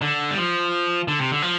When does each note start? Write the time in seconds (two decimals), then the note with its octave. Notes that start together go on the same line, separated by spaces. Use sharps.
0.02 D3
0.31 G3
0.37 F3
1.08 D3
1.19 C3
1.32 D3
1.42 F3